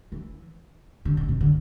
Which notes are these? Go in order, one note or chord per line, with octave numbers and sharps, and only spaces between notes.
E3
D3
B2
C3
D3